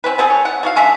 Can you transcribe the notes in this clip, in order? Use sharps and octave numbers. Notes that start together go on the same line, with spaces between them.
C4 C#4 B4
B3 C4 G#4 A4
C#5
F#5
A3 F#4 F5
G#3 C#4 D4 E5